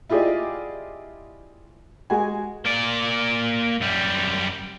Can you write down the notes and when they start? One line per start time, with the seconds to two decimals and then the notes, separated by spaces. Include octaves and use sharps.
0.09 E4 F4 G4 G#4 D5 D#5
2.10 G#3 F#4 G#5
2.65 A#3 D5
3.81 F#2 G3